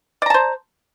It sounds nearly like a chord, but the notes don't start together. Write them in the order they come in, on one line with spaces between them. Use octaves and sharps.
D5 A#5 A5 C5